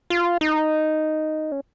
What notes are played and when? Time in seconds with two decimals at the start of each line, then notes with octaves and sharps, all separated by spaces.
0.10 F4
0.41 D#4
1.52 C#4